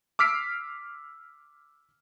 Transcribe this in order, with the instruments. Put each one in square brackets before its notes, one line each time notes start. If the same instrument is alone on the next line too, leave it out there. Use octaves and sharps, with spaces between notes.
[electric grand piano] D6 E6 F6 B6 C7 D7